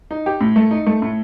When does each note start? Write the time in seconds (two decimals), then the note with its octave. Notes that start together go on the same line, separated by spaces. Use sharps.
0.11 D#4
0.26 G4
0.41 A2
0.56 A3
0.71 D#4
0.87 A3
1.02 A2